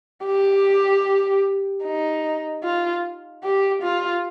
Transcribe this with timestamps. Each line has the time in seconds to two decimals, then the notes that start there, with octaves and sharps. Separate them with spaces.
0.26 G4
1.84 D#4
2.63 F4
3.44 G4
3.82 F4